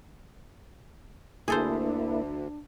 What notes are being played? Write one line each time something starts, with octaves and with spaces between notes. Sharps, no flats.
D2 A#3 D4 E4 G#4 A4 C5